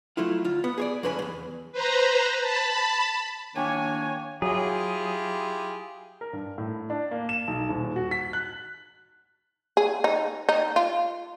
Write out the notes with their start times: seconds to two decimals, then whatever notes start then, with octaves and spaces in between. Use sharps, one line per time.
0.17 F#3 A3 E4 F4
0.44 D2 F4
0.64 B3
0.78 G#4 C#5 D5
1.03 F2 D3 B4 C#5 G#5 B5
1.19 E2 F#3
1.72 B4 C5 A#5
2.41 A5 B5
3.56 D#3 A#3 D4 C#5 G#5
4.42 F#3 E4 F4 G4 G#4
6.21 A#4
6.33 G2
6.58 A2
6.90 D4
7.11 A#3
7.29 E7
7.48 B1
7.69 D#1
7.96 F#4
8.11 B6
8.33 F#6
9.77 G#4
10.04 D#4
10.49 D#4
10.76 F4